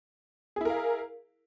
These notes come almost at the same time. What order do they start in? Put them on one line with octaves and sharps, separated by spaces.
G#4 E4 A#4 F5